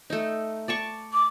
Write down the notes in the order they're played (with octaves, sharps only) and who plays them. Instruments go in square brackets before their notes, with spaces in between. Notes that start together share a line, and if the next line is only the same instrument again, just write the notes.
[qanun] A3 D#4
D5 A5 C#6
[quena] D6